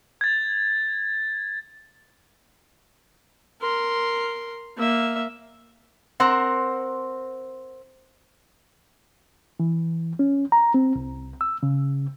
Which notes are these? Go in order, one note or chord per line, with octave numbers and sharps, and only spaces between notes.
G#6 A6
A#4 C6
A#3 E5
C4 A#4 C5 F#5
E3
C#4
A#5
C4
C2
E6
C#3